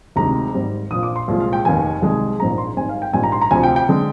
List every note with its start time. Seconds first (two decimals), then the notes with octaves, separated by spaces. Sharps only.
0.16 D2 C3 D#3 G#3 A#5
0.53 G#1 G#2 G3
0.91 A#1 A#2 F3 D#6
1.03 D6
1.16 C6
1.28 C2 A#2 F3 G#3
1.40 F5
1.53 G5
1.65 F1 D#2 D#3 G#5
2.02 C2 C3 D#3 G#3
2.39 A#1 G#2 F3 G#3 A#5
2.58 C6
2.76 G#1 G#2 G3 G#5
2.89 F5
3.02 G5
3.13 A#1 G#2 G3 G#5
3.23 A#5
3.32 C6
3.41 A#5
3.51 D2 C3 F3 G#5
3.63 G5
3.76 G5
3.89 D3 G#3